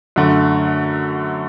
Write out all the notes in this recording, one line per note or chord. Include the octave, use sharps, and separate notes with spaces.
F#2 D3 A3